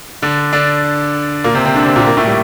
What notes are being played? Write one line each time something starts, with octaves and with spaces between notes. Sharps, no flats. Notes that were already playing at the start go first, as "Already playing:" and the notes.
D3 D4
D3 D4
A#2 A#3
C3 C4
C3 C4
D3 D4
C3 C4
A#2 A#3
A#2 A#3
A2 A3
G3